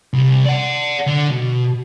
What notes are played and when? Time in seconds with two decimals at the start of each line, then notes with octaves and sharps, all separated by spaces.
0.13 C2
0.45 D5 F#5
1.07 D3
1.31 B2